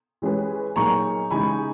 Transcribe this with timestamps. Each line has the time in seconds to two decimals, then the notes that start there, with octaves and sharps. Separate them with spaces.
0.22 E3 G#3 C#4 G#4 B4
0.76 A#2 F#3 A#3 D#4 G#4 A#5 C#6
1.31 C#3 E3 G#3 D#4 G#5 B5